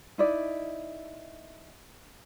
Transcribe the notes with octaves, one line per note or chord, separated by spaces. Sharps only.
D#4 E4 D5